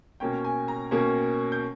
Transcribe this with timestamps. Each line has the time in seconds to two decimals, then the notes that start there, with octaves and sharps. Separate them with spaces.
0.20 B2 A#3 C#4 G5
0.45 G#5
0.68 A#5
0.91 B2 A#3 C#4
1.52 G6